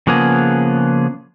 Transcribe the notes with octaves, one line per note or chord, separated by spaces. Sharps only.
C#3 F3 A#3 B3 G#4